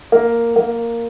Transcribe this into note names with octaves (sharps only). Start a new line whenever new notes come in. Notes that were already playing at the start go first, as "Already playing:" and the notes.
A#3
A#3